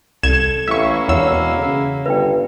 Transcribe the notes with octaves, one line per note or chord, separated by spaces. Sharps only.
C2 A4 G#6 E7
A1 A#3 E4 E5 C#6
E1 E2 C#5 F#5 E6
C#3
G1 B4 G5